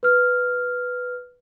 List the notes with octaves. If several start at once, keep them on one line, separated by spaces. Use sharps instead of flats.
B4 F6